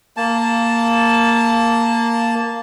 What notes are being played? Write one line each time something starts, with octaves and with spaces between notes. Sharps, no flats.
A#3 A5